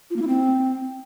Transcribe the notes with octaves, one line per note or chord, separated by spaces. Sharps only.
F4
A#3
E4
C4